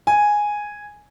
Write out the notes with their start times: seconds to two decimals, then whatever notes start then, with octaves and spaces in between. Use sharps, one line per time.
0.07 G#5